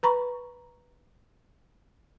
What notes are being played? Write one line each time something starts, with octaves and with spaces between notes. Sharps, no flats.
B4 A#5 B5 C#6